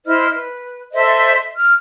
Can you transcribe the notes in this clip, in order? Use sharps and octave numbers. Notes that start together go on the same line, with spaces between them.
E4 C5 D#5 F6
B4
A4 C5 D#5 E5
F6